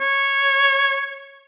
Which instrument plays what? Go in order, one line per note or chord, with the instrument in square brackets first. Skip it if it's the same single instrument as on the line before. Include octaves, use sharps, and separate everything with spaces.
[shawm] C#5